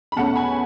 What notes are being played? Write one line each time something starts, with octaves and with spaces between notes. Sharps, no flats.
B5
E2 B2 A3 C#4 F#5 A5
G#5 B5